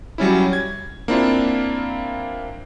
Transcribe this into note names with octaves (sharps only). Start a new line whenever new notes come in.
F#3 G3 C#4 E4
G#6
A#3 C4 D4 E4 F4